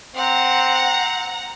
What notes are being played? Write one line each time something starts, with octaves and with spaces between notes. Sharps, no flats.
C4 F#5 A#5